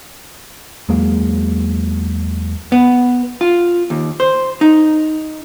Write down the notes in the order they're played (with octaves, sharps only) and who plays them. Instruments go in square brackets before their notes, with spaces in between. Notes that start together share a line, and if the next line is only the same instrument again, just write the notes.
[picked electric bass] E2 F#3 G#3 A#3
[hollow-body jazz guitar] B3
F4
D#2
C5
D#4